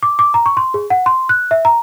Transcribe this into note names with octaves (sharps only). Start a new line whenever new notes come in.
D6
D6
A#5
C#6
C6
G#4
F#5
C6
F#6
E5
A#5